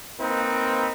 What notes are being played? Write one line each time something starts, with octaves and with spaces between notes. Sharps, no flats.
A#3 C4 D#4 A#4 B4